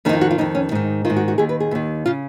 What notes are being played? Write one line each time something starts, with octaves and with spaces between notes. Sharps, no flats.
F2 D#3 C#4 D#4
F4
F#4
F4
F2 D#3 D#4
C#4
G#2 D#3 D#4
D#3 F4
G#2
F#4
F#4
D#2 D#3 G#4
B4
G#4
D#2 D#3
C#3 F4